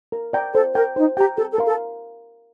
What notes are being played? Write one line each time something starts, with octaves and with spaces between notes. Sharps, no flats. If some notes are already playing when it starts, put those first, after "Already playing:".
A#4
D5 G5 A#5
A4 C5
A#4 G5 A#5
D#4 C5
G4 G5 A#5
G4 A4
A4
A#4 F5 C6
A4